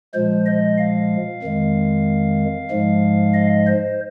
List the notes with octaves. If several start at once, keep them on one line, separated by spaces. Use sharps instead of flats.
A#2 F3 G#3 C5
D#5
F5
F2 D#3 G#3
G#2 F3 G#3
D#5
C5